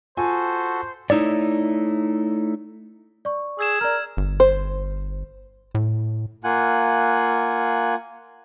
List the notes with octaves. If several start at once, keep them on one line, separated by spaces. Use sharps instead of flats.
F4 F#4 A4 C5 G#5
A3 D#4 E4 C#5 D5
D5 C#6
G#4 E6 G#6 E7
A#4 D5 F6
G1
C5
A2
A#3 F4 F#5 G#5 F#6